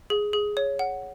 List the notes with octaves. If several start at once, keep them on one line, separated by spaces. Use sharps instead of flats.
G#4
G#4
C#5
F#5